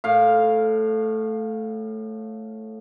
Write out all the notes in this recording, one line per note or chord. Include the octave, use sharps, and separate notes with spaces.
A2 F5